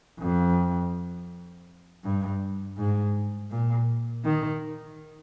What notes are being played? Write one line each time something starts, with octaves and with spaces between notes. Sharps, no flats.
F2
G2
G#2
A#2
D#3